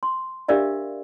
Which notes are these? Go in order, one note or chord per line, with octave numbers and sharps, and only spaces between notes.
C6
D4 G4 A#4 D5 E5 F5